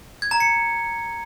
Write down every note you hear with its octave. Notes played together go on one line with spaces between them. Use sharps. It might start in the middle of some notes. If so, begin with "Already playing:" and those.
G#6
A#5
C#7